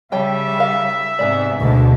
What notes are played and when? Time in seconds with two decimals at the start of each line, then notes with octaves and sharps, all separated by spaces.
0.12 C#3 G3 C#5 E5 G5 A5
0.58 D#3 F5
1.19 G#2 C3 B3 G#4 D5
1.60 D2 B2 D3 G#3